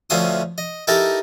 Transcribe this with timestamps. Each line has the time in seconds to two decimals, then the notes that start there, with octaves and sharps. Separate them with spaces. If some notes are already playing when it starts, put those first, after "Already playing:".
0.10 D2 F3 C#4 E5 C6 D#6
0.58 D#5
0.87 D#4 E4 G4 A4 A#4 A5